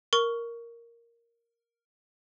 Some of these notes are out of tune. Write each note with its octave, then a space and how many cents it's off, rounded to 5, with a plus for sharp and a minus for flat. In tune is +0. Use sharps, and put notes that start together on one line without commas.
A#4 +0 C#6 +15